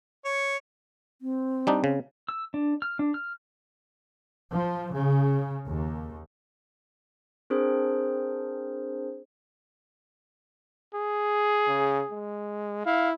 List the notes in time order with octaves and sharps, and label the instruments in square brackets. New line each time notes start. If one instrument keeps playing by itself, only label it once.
[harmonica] C#5
[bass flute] C4
[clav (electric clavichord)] G3 D4 D#4
C#3
[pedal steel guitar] E6
D4
F6
D4
F6
[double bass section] F3
C#3
D#2
[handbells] C4 D4 G#4 A#4 C5
[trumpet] G#4
[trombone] C#3
G#3
[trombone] E4 [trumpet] F5